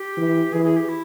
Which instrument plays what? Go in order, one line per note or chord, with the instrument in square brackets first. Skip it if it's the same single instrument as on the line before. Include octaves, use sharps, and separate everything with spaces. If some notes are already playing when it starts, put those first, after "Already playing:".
Already playing: [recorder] G4
[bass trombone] E3
[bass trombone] E3 [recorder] G#4
[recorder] G#4
G4
E4